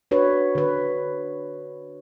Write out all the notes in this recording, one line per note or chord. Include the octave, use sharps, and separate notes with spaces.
D4 F#4 B4 C#5
D3 B4